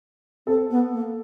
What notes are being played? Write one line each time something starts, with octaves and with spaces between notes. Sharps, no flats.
C4 A4
B3
A#3